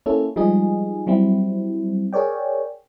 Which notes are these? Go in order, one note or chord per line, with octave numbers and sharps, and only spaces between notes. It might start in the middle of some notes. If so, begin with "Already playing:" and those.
A#3 C#4 E4 A4
F3 G3 G#3 D#4 G#4
F#3 G3 C4 E4
G#4 A#4 C#5 D5 G5